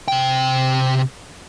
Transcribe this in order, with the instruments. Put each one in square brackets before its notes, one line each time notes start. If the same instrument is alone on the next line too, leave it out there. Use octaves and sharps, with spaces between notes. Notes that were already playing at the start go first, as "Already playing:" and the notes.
[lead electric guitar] C3 G5